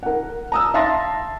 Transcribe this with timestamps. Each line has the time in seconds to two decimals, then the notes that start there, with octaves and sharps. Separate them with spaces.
0.03 A#4 F#5
0.52 A#5 D#6 E6
0.74 E5 F5 A5 C6 A6 A#6